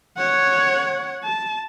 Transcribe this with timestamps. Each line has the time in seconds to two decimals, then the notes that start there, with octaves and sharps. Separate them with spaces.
0.17 C#5 F#5
1.24 A5